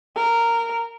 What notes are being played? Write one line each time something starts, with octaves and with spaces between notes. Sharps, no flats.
A#4